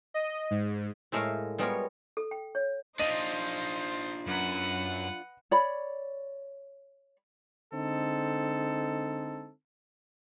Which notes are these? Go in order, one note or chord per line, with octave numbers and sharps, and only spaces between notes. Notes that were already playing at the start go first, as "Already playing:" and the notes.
D#5
G#2
A2 G#3 A3 A#4 E5 F5
G3 G#3 B3 F4 A#4 C#5
A4
G5
C#5
D4 D#4 F4 C5 D#5 D#7
F#2 B4 F#5
C#5 D5 B5
D3 G#3 C4 D#4 A4